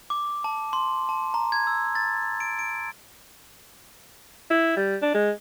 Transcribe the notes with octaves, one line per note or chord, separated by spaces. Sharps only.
D6
A5
C6
A5
A#5
G#6
E6
A6
D7
D7
E4
G3
D4
G#3